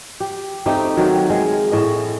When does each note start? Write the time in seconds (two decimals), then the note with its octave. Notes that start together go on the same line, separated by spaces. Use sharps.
0.20 G4
0.66 A3 C4 D#4 G4
0.97 D#3 F#3
1.30 G#3
1.71 A2 D#5